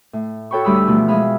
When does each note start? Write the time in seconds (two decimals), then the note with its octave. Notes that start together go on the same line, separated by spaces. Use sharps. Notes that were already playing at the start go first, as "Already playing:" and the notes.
0.13 A2
0.51 F#4 A4 C#5 G5 B5 C#6
0.65 D2 G3 G4 B5 D#6 E6
0.87 B2 E3 F3 A3
1.08 G#3 G#4 E5 F5 B5 F6